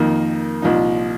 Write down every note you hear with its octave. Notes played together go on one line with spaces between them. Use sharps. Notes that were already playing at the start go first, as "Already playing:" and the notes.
Already playing: F2 D#3 A#3
C2 A#2 F3 D#4